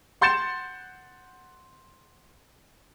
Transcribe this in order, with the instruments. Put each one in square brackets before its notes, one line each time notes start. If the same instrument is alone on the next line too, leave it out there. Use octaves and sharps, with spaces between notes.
[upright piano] F#5 C6 G6 A6 C#7 E7